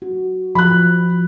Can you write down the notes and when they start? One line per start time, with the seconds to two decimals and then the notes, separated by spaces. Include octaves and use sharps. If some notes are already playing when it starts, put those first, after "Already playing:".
0.02 F#4
0.55 F3 B5 F#6